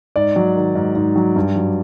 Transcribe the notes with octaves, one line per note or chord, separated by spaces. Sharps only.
G#2 D5
F#3
D#3
G#2
G#2
F#3
G2
F#3